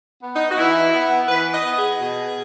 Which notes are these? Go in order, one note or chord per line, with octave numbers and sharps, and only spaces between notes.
B3
D#4
F#4
E3 E4
B3
E3 B4
D#5
B3
G#4
B2